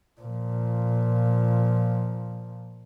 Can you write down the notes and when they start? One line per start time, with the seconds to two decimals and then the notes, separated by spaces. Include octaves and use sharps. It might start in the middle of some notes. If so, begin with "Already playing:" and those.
0.21 A#2 F3